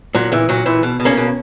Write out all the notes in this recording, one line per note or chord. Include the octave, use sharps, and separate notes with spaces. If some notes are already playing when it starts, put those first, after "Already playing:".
A#2 F#3
A#2 E3
A#2 F#3
A#2 E3
B2
B2
A#3 C#4
B2